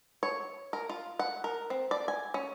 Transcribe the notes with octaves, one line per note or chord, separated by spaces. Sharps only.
C#5
A#4
F4
F#5
A#4
C4
D5
G#5
C#4